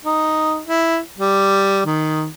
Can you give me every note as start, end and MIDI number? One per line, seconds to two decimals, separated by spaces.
0.05 0.61 63
0.68 0.98 64
1.18 1.84 55
1.85 2.27 51